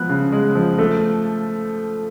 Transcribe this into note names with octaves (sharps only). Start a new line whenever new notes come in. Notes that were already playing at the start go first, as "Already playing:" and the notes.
Already playing: F3 G#3 B3 F#6
C#3
G#3
F3
A3